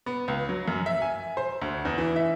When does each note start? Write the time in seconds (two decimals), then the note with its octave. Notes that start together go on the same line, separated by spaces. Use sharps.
0.06 B3
0.28 C#2
0.49 F#3
0.68 F#2
0.86 E5
1.02 G#5
1.37 C5
1.62 D2
1.85 E2
1.98 E3
2.16 E5